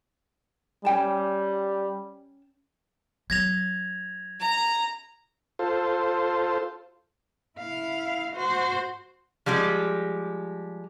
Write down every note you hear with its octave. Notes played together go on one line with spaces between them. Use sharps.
G3 C#4 G5 A5
F#3 G#6 A#6 F7
A#5
F4 A4 C5
E4 F5
F#4 C5
F3 G3 G#3 G4